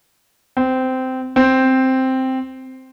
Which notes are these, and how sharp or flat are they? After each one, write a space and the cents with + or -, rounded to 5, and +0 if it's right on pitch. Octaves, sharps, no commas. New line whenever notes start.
C4 -15
C4 +0